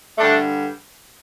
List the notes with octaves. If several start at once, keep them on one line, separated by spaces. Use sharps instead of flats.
G2 D3 A3 D4